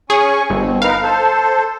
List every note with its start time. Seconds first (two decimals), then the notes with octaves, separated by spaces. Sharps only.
0.10 C#4 G#4 G#5 C#6
0.50 G1 B2 C4
0.82 D#4 A#4 B4 F5
1.03 A4 C5